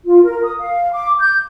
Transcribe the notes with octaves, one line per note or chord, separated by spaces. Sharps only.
F4
A#4
D#6
F5
D6
G6